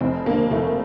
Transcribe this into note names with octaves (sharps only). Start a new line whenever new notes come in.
F1 C4
D#2 D3 A#3
F1 A3